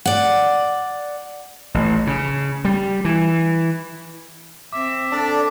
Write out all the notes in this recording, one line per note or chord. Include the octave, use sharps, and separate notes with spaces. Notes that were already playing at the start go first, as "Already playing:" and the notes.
D5 F#5
A1
C#3
G3
E3
C4 E5 D6
D4 A4 D5